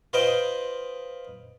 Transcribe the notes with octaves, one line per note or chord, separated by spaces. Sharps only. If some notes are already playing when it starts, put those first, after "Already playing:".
F4 B4 C5 D#5 F5 G5